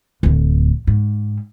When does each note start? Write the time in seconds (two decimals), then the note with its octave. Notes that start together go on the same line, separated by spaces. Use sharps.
0.23 D1 A1
0.87 G#2